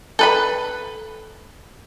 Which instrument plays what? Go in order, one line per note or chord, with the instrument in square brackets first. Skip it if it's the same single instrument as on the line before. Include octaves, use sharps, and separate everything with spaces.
[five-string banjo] A4 B4 B5